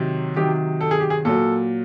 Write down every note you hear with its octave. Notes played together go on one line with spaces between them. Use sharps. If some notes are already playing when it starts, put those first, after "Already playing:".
Already playing: C3 D#3 F#3
C3 D#3 F#3 G4
A4
G#4
G4
G#4
A#2 F#3 A4